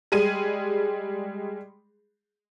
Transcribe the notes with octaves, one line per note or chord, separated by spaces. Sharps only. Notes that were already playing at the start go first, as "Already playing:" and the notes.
G3 G#3 G#4 D#7